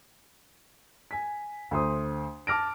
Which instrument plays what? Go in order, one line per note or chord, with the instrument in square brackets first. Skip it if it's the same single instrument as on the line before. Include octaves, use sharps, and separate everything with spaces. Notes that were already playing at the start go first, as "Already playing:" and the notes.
[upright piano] G#5 B6
D2 C5 C6 D#6
A5 D6 F6 A#6 D7